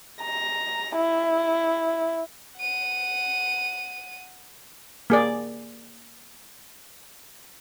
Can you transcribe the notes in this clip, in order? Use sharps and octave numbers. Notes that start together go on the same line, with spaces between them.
A#5
E4
F#5 D#7
A#3 G#4 D5